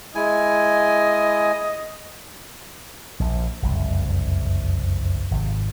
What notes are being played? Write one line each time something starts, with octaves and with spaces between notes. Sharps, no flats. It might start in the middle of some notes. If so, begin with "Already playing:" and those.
G#3 E4 D#5 G#5
A#1
F#1 C2 F2
G#1 C3